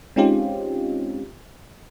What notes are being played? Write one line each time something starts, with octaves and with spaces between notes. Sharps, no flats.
G#3 C4 C#4 D#4 F4 G4